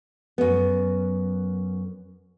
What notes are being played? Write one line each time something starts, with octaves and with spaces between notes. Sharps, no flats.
F#2 B3